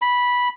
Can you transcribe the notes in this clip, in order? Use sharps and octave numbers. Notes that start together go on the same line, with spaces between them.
B5